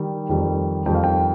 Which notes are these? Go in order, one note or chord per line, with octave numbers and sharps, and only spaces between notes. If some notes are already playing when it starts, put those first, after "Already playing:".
Already playing: D#3 G3
F2 D#3 G3
F2 D#3 G3 G5
F5
G5